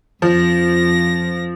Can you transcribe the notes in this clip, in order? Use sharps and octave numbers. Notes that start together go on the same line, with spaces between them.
F2 F3 A#6